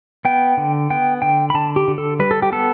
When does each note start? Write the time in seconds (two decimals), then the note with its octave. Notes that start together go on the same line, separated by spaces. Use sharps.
0.25 B3 G5
0.57 D3
0.90 B3 G5
1.22 D3 G5
1.50 B5
1.54 D3 A5
1.76 G4
1.88 D3
1.98 A4
2.19 G3 B4
2.31 A4
2.42 G4
2.52 B3 A4